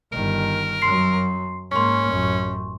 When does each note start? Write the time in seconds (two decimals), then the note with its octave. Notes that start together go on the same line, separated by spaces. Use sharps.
0.13 G1 D#3 A#4
0.82 F#2 F#3 C6 C7
1.72 G#2 A#3 C#4 C6 C#6
2.09 A1 F#2